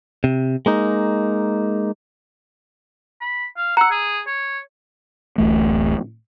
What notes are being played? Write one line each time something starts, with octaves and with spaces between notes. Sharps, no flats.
C3
G#3 A#3 D#4
B5
F5
F#5 A#5 E6
G#4
C#5
D1 A1 A2 A3